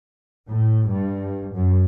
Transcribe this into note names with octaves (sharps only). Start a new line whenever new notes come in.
A2
G2
F#2